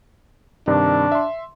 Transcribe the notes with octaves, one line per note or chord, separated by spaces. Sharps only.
G2 C3 D#3 D4
E5 C6